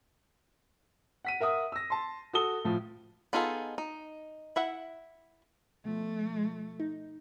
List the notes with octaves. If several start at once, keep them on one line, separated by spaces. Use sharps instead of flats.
F#5 B6 D#7
A#4 E5 F#5 D#6
E6 A#6
A5 C6
F#4 A4 D#6 G7
A2 F3 A3
B3 D#4 F4 G#4 A4
D#4
E4 E5 F#5
B2 F3 A3
D#4